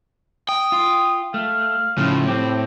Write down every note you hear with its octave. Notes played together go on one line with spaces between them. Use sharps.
G5 D#6
F4
A3 F5
A2 C#3 F3
C4 G4